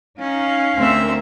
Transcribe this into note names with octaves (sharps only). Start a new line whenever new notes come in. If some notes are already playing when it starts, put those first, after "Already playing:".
C#4 D#4 F5
D2 C4 A#4 C5 E5